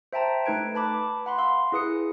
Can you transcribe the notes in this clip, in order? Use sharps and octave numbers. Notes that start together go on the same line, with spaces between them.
C5 E5 G5 A5 A#5
A3 D#4 B4 G#6 D7
B4 A5 B5 D6
F#5 B5 C6
F5 C6 E6
E4 G#4 B4 D#6 C#7